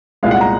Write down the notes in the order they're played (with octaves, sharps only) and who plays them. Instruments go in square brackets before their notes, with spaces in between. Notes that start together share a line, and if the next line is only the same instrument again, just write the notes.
[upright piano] C2 A#2 G#3 F5
F#5
A#5